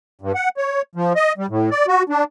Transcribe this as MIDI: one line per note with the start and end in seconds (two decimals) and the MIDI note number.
0.21 0.32 43
0.35 0.49 78
0.57 0.82 73
0.95 1.13 53
1.16 1.33 75
1.38 1.46 55
1.50 1.70 45
1.71 1.86 74
1.88 2.03 66
2.09 2.24 62